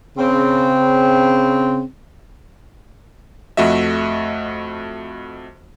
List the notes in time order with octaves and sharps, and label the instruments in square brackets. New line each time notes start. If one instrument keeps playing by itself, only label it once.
[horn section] C#3 C4
[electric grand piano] F2 A3 F#4 D#5 E5